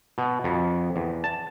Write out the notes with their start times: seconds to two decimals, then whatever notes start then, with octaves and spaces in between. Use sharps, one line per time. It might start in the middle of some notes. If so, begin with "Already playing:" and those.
0.18 B2
0.44 F2
0.96 E2
1.24 A5